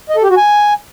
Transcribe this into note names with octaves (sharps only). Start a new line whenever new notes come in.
D#5
A4
G4
F#4
G#5